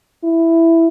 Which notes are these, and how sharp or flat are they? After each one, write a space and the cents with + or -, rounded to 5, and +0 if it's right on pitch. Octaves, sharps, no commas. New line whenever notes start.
E4 +5